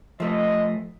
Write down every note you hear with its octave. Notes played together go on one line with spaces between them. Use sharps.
F3 A3 D#5